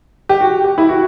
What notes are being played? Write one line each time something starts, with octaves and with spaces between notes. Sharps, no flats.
G4
F#4
G4
E4
F#4